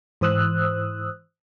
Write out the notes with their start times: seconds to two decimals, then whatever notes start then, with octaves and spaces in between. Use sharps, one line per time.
0.21 G#2 E3 C5 D#6 E6 F#6